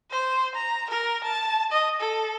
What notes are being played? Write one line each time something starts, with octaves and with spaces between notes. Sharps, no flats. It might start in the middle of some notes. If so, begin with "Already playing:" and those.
C5
A#5
A#4
A5
D#5
A4